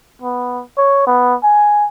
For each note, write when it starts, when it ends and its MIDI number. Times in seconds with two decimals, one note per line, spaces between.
0.22 0.63 59
0.77 1.03 73
1.07 1.35 59
1.44 1.87 80